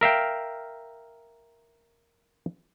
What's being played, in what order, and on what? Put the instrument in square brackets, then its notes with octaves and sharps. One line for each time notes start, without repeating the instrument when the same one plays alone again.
[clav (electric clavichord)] A#4 E5 F5 G5